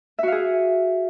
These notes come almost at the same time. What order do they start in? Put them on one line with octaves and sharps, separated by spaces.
E5 F#4 F5 G#4